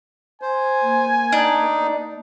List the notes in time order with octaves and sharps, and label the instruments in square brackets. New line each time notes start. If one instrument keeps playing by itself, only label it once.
[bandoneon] C5 [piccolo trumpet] G#5
[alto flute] A#3
[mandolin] D4 [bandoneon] D#4